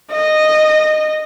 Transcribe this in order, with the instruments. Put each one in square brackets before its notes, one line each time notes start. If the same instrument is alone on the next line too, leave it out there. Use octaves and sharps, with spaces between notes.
[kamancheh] D#5